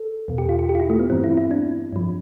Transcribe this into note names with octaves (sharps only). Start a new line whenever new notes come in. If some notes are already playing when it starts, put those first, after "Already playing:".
Already playing: A4
E2 B2
G4
F4
G4
G4
F4
E4
A3
B3
G2 E3 C4
E4
E4
D4
G2 F3